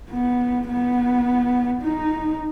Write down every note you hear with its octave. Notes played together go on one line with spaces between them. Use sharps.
B3
B3
D#4